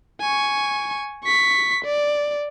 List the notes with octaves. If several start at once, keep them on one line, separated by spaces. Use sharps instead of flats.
G#5 C#6
C#6 B6
D5